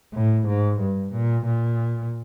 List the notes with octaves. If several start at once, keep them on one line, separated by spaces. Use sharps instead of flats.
A2
G#2
G2
A#2
A#2